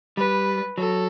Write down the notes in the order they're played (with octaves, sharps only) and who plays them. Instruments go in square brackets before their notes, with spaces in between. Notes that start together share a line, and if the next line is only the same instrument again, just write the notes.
[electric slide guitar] G3 [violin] B4
[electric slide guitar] F#3 [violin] A4